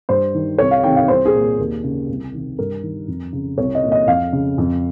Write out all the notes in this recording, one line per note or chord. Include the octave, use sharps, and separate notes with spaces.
G2 C5
D#3
C2 C#5
F5
C3 D#3 G5
F5
C2 C5
G#4
A#2
D#2
C#3
C2
C3 D#3
G2 A#4
D#3
F2
C#3
C2 C#5
D#5
A#2
D#5
F2 F5
C#3
F2